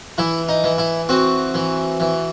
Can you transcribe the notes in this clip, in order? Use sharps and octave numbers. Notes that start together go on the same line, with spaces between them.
E3 E4
D#4
E3
E4
C4 F#4
E3
E3